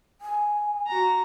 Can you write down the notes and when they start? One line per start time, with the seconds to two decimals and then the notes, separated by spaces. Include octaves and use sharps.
0.21 G#5
0.87 F#4 A#5